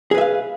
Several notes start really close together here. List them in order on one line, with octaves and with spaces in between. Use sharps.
G#4 B4 E5 F5